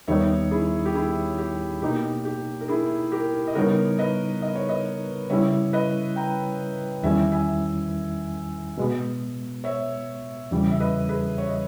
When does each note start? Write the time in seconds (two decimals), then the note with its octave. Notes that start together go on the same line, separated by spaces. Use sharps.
0.08 D#2 D#3 G3 B3 D#4 C#5 E5
0.51 E4 G#4
0.86 G4
0.94 E4 G#4
1.38 G4
1.82 B2 A#3 D#4 G4
2.25 G4
2.61 A#4
2.68 E4 G#4
3.12 G4 A#4
3.47 D#5
3.55 C#3 G3 B3 D#4 A#4 C#5
3.99 B4 D#5
4.42 D#5
4.56 C#5
4.69 B4 D#5
5.30 C#3 G3 C#4 E4 C#5 E5
5.73 B4 D#5
6.16 G5 A#5
7.03 E2 D#3 G3 C#4 E4 E5 G#5
7.32 E5 G#5
8.78 B2 G#3 B3
9.64 C#5 E5
10.51 E2 C#3 E3 G3 C#4
10.71 E5
10.80 B4 D#5
11.09 G#4 B4
11.38 C#5
11.49 D#5